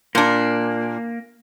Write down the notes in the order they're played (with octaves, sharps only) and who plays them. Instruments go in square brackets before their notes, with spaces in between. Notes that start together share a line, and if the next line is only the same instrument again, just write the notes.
[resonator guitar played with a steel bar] A#2 D4 [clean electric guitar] A#3